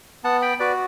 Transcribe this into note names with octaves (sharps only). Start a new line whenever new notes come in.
B3 F#5 A5
G5 B5
F#4 B4 D5